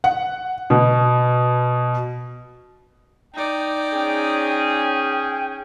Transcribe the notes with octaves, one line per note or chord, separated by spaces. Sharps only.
F#5
B2
D#4 D5 G5
C#4 G#4